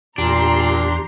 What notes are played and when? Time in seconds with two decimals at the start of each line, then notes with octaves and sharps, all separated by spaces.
0.18 E2 A#2 D4 G4 A#5 C6